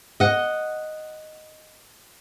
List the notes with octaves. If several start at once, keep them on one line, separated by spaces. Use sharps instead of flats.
D#5 F#5